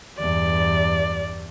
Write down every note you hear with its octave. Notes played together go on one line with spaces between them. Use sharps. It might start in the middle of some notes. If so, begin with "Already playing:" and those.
E2 G2 D5